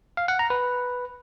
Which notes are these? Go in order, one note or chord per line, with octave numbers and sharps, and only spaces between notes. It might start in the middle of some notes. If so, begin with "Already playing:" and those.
F5
F#5
A#5
B4